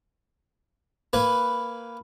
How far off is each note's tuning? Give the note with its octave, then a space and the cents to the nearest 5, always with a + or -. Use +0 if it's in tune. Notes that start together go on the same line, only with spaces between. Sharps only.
A#3 -5 B4 +0 G#5 +0